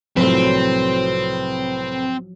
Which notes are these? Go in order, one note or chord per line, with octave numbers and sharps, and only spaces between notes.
C2 A2 F3 F#3 A3 C4 B4 C5